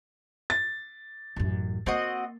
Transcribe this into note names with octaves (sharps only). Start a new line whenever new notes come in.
A6
A1 F#2
A#3 C4 F#4 D#5